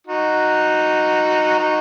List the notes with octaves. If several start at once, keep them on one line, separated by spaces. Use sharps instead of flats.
D#4 F#4
D#4 F#4